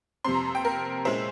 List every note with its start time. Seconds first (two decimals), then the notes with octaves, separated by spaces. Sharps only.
0.24 F2 C3 G3 C4 C6
0.34 A#5
0.45 A#5
0.55 G5
0.65 A#4
1.05 A#2 G#3 C#4 E4 C5